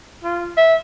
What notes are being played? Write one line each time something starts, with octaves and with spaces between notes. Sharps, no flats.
F4
E5